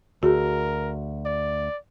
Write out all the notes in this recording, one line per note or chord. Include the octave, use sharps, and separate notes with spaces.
D2 F#4 G#4 A#4
D5